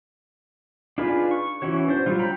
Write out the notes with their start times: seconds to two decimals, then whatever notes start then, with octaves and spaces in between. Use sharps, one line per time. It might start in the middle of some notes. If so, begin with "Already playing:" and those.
0.98 D4 D#4 F4 G#4 B4
1.31 C#6
1.62 E3 C#4 F#4 C#5
1.88 D4 C5
2.06 F#3 G3 F4
2.19 G5 A#5 B5